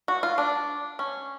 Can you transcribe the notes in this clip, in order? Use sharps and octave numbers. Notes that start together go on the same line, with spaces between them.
F#4
F4
D4
C#4